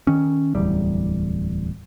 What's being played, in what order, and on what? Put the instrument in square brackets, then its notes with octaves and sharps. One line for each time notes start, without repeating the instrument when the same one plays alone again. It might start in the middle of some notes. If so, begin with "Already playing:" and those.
[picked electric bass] D#3 C#4
D1 E2 G3